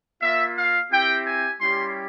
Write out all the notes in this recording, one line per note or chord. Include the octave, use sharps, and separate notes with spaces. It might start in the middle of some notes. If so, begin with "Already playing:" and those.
A#3 F4 E5
F5
C4 E4 G4 G5
G#5
G3 C#4 E4 G4 C6